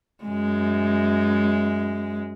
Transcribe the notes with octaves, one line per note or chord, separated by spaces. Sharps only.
F#2 G#3